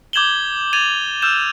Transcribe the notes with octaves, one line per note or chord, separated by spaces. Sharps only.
D6 G6 G#6 E7 F#7 G7
G#6 A6 D#7 F7
E6 F6 G6 E7